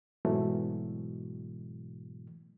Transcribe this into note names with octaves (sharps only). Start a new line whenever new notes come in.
G#2 B2 E3 F#3 A3